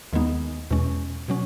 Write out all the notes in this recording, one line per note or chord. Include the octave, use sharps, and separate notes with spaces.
D#2 D#3 G#3 B3 D#4
E2 B2 G#3 C#4
B2 F#3 C#4